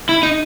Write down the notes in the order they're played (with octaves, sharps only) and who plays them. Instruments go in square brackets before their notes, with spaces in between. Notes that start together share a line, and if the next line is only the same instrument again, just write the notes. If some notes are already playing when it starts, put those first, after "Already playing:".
[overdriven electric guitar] E4
D#4